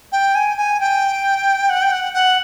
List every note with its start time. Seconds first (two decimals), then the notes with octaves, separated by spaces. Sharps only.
0.12 G5
0.35 G#5
0.57 G#5
0.80 G5
1.70 F#5
1.82 G5
1.92 F#5
2.14 F#5